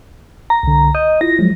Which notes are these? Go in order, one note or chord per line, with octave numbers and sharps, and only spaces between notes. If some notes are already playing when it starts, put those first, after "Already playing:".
A#5
C2 D3
D#5 G6
E4 F4 A#6
F3 F#3 G#3